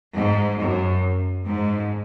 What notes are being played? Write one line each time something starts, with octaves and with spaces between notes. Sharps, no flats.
G#2
F#2
G#2